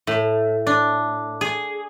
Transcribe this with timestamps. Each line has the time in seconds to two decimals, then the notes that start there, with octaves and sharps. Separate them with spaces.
0.07 A2
0.67 D4
1.41 G#4